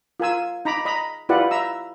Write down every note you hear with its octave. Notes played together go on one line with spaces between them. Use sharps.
F4 A#4 G#5 E6
D#4 A#5 B5 D6
D#5 A#5 B5
E4 F4 G4 B4 D5 F#5
E5 A#5 E6